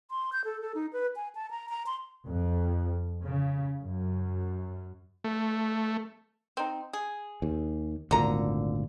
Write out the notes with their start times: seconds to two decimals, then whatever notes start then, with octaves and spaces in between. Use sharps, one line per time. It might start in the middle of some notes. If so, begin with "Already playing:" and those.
0.11 C6
0.32 G6
0.45 A4
0.61 A4
0.75 D#4
0.93 B4
1.16 G#5
1.35 A5
1.51 A#5
1.69 A#5
1.86 C6
2.26 F2
3.24 C#3
3.83 F#2
5.24 A3
6.57 C4 D#4
6.93 G#4
7.42 D#2
8.11 G#1 D2 A#2 D3 A#5